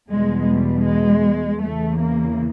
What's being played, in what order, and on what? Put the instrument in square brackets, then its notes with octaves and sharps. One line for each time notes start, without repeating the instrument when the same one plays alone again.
[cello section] E2 B2 G3 G#3
G3
G#3
E2 C#3 E3 A3
A#3